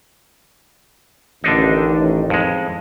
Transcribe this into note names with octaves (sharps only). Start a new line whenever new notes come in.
A1 D3 D#3 D4 D#4
F2 G#3